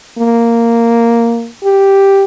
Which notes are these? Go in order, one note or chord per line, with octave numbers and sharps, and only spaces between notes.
A#3
G4